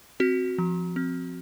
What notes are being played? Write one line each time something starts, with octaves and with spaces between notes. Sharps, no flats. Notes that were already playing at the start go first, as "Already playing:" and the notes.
C4 F#4
F3
C4